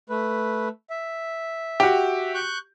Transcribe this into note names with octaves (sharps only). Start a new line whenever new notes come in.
A3 B4
E5
F#4 G4
C#6 F#6 G6